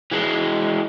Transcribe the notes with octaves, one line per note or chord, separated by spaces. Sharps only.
E3 G#3